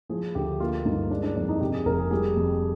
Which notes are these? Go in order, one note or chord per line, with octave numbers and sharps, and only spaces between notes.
F3 G#4
D2 G4
A#3 F4
G2 D#4
G#3 D4
D4
F2 D4
D#4
C3 G4
G#4
F1 A#4
G#4
G3 G#4
F2